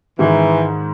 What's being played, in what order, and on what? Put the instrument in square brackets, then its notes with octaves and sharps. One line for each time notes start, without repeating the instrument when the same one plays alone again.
[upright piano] G#2 D#3 G#3 [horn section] E3